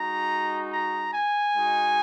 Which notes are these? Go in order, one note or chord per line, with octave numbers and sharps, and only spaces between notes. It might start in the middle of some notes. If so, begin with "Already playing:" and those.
Already playing: G#3 D#4 F#4 A#5
A#5
G#5
G#3 D#4 F#4